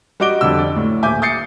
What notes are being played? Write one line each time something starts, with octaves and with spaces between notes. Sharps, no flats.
G3 F#4 D#5 D6 D7 G7
F2 D3 E6
D5
A2
D#1 E5 G#5 D6 G6
D#6 G6 A6 C7 C#7